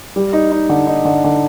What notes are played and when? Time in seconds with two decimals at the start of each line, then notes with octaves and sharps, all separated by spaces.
0.16 G3
0.33 D#4
0.52 D#4
0.69 D3
0.87 D#4
1.05 D3
1.24 D3